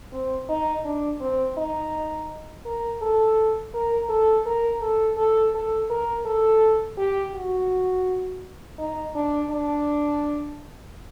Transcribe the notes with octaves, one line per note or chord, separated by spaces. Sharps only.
C4
D#4
D4
C4
D#4
A#4
A4
A#4
A4
A#4
A4
A4
A4
A#4
A4
G4
F#4
D#4
D4
D4